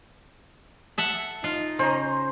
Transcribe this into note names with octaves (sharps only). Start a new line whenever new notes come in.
A4 E5 F#5
D#4 F4
C#3 C5 A#5